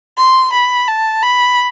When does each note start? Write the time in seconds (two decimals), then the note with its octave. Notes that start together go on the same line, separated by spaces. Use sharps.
0.17 C6
0.53 B5
0.88 A5
1.23 B5